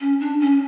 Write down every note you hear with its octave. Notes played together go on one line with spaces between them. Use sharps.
C#4
D4
C#4